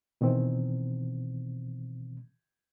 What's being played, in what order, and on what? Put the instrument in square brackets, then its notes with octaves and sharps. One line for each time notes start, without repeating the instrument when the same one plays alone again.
[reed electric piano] B2 D#3 E3 C4